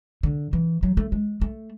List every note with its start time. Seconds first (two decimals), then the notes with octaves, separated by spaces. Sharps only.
0.23 D3
0.53 E3
0.83 F#3
0.97 A3
1.12 G#3
1.41 A3